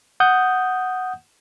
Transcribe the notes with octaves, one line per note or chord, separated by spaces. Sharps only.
F#5 D#6 G6